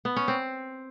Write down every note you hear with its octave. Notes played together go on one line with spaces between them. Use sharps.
B3
C#4
C4